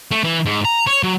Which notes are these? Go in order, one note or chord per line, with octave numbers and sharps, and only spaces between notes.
A3
E3
G#2
A#5
C#5
F#3